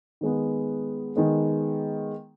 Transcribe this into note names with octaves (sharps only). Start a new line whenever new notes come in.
D#3 G#3 B3
D#3 G#3 B3